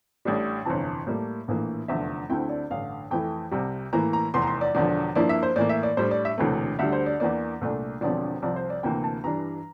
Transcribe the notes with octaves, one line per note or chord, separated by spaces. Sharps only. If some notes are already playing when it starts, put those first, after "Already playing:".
A1 A2 G3 D4
G1 F2 C3 E3 A5
A2 G3 A#3
A#1 A2 E3 A#3
F1 E2 D3 F3 E5
D2 D3 A3 C4 E4 G5
D5
A1 G2 D3 F5
F2 E3 A3 E4 G5
C2 C3 G3
A2 E3 A#3 E4 A#5
A#5
F1 E2 E3 C6
A#5
C6
D5
E1 E2 D3 F3 D5
G2 F3 A#3 E4 D5
E5
C5
A2 E3 A#3 D5
E5
D5
A2 G3 D4 C5
D5
E5
E1 D2 C3 E3 A3
D2 D3 G3 E5
C5
D5
E2 E3 A#3 D4 D5
C2 A#2 A3 D4
E1 E2 D3 F3 C4 D5
C2 C3 F3 D5
C5
D5
D2 C3 E3 A#3 G5
A5
G2 E3 G3 D4 A#5